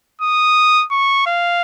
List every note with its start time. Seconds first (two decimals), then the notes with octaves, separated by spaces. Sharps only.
0.21 D#6
0.91 C#6
1.27 F5